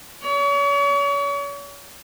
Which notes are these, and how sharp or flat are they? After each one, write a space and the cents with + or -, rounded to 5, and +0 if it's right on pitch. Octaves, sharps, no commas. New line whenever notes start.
C#5 +40